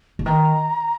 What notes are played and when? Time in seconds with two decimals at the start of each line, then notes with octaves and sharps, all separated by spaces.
0.19 D3
0.26 D#3 A#5